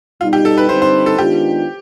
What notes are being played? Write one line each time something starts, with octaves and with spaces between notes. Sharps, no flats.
B2 G3 B3 D#4 F4
G4
A4
B4
D3 G3 C4 D#4 C5
C5
A4
D#3 G#3 B3 D4 F4 G4